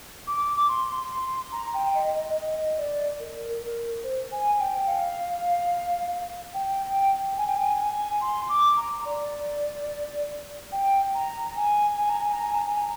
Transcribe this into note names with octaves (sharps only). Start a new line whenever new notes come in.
D6
C6
C6
A#5
G5
D#5
D#5
D#5
D5
A#4
A#4
C5
G#5
G5
F5
G5
G#5
G5
G#5
G#5
C6
D6
A#5
D5
G5
A#5
G#5
G#5
A#5
G#5
A#5
G#5
A#5
G#5
A#5